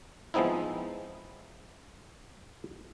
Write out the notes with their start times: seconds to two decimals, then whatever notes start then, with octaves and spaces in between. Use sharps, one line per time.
0.34 F3 G#3 B3 C4 D#4 E4